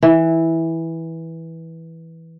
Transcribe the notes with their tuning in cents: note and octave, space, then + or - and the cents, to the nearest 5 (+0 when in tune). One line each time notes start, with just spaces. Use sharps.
E3 -10